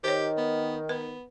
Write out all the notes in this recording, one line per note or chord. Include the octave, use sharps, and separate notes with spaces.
D#3 G4 C5 C#5
B3
B3 B4